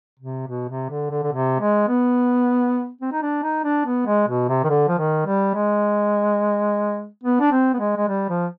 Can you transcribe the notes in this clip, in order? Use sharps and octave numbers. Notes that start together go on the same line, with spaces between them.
C3
B2
C3
D3
D3
D3
C3
G#3
B3
C4
D#4
D4
D#4
D4
B3
G#3
B2
C3
D#3
D3
F3
D#3
G3
G#3
B3
D4
C4
B3
G#3
G#3
G3
F3